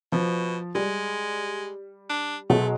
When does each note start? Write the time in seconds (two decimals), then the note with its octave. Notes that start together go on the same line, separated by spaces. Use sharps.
0.12 B2 F3
0.75 G3 G#3
2.10 D4
2.50 B2 F#3 G#3 A3